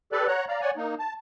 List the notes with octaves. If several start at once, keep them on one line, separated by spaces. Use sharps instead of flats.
G4 A4 B4 D5
C#5 F#5 A#5 F#6
D5 F5 A#5
C#5 D5 F#5 G#5
A#3 D#4
A5